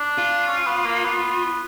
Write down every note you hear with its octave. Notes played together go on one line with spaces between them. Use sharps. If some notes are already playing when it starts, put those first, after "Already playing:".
Already playing: D4
F4
C#4
B3
A#3
B3